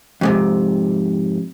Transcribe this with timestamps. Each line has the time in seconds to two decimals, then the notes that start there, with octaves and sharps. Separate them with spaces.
0.21 F2 G#2 C3